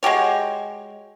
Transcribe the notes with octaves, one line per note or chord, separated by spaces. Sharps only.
G#3 F#4 G4 C#5